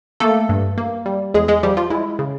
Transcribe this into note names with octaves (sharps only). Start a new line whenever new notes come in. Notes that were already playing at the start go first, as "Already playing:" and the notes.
A3 A#3 A4
G2
A#3
G3
E2 G#3 G#4
G#3 G#4
F3 G3 G4
F3 F4
G#3 E4
C#3